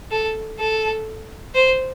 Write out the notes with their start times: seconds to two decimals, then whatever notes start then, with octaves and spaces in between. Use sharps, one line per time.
0.11 A4
0.59 A4
1.55 C5